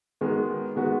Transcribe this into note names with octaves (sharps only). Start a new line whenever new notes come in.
D#3 G#3 B3 F#4
D#3 G#3 B3 F#4